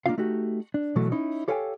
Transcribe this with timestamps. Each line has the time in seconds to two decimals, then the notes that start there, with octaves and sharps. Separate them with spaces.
0.06 A#3 C4 D4 D#4 F4 F5
0.18 A3 D#4 F#4 G4
0.74 D4
0.96 B2 E3 F#3 A3
1.12 C#4 D#4 E4
1.48 G4 A4 C#5 F5 G5 G#5